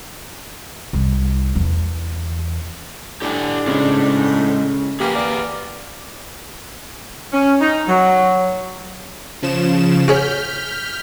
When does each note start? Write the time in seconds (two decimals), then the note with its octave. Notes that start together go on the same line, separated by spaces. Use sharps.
0.93 C2
1.55 E2
3.22 A2 D4 G4 D5 G#5
3.68 C#3 G#3 G#4 C5
5.00 A#3 G4 G#4 B4 G#5
5.15 D5
7.33 C#4
7.62 D#4
7.88 F#3
9.42 C#3 F3 E7
10.08 F#4 G#4 C#5 F6 G6 B6